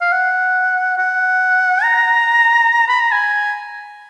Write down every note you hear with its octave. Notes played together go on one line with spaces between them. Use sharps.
F5
F#5
F#5
A#5
B5
A#5
G#5